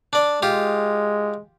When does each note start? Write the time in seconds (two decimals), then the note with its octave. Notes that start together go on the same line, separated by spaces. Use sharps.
0.13 D4 D5
0.42 G#3 F4 G4 D#6